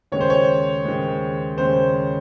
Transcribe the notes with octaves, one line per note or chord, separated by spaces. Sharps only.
D#2 C#3 G#3 C#5
C5
C#5
D#2 C#3 G#3
D#2 C#3 G#3 C5